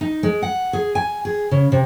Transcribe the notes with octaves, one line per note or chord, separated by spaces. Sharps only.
D#4
G#3
F#5
G#4
G#5
G#4
C#3
C3